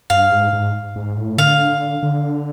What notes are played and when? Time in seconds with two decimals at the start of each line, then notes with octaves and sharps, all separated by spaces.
0.10 G2 F5
0.32 G#2
0.53 G#2
0.96 G#2
1.17 A2
1.38 D3 F5
2.03 D3